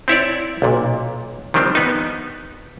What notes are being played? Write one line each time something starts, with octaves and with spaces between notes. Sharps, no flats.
C4 E4 C#5 D5
B1 A#2
D#3 F3 G3 C4 D4
B3 D#4